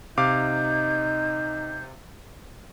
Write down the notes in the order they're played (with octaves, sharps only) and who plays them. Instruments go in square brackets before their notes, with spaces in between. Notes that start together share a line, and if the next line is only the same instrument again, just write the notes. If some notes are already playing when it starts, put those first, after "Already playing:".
[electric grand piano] C3 F5 D6 [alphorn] D#4 [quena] G6